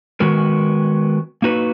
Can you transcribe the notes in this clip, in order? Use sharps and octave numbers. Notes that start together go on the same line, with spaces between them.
D#3 G#3 B3 F#4 A#4
A#3 D#4 F#4 B4